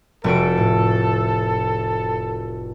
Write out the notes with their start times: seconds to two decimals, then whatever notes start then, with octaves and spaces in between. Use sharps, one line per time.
0.24 F1 F#4 A4 D7
0.58 A2